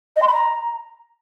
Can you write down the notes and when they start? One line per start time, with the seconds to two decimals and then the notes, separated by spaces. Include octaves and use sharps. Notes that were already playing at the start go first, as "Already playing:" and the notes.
0.16 D#5
0.22 C6
0.27 B5
0.33 A#5